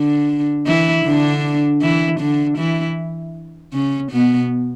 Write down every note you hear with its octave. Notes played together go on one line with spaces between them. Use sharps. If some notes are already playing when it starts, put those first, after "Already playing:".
Already playing: D3 D4
E3 E4
D3 D4
E3 E4
D3 D4
E3 E4
C#3 C#4
B2 B3